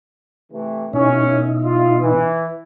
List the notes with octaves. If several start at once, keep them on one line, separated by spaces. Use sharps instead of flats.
C3 E3 A3
F#2 B2 C#4 D#4 E4
F4
E3